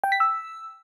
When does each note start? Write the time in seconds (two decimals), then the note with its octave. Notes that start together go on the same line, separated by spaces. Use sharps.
0.04 G5
0.12 B6
0.20 E6